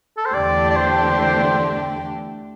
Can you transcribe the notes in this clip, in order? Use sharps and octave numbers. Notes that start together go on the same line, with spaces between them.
A4
C5
E2 D3 A3 D4 G4 D5
D5
C5
C5
C5